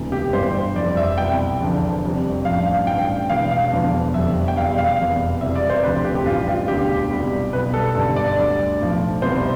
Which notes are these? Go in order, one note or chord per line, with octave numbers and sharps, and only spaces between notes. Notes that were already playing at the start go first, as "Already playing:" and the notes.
Already playing: E1 D2 C3 E3
G4
G1 G2 E3 G3 C5
F1 F2 E3 G3 D5
E5
C2 B2 G3 G5
E2 D3 F3
F1 F2 C3 G3
A1 G2 F3 F5
F5
A1 G2 E3 G5
E1 E2 B2 F5
F5
E1 E2 D3 F3
F1 F2 D3 G3 E5
G5
E2 B2 G3 F5
F5
F1 E2 B2 G3
E2 C3 G3 E5
D5
C5
D2 C3 F3 B4
G4
G4
A1 G2 E3 F4
F4
E1 D2 D3 G3 G4
C2 B2 G3
B1 B2 G3 B4
A4
G1 G2 D3 G3 A4
D5
D2 D3 G3
B1 A2 F3
C2 B2 G3 C5